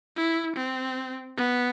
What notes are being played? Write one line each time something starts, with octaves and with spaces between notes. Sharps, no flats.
E4
C4
B3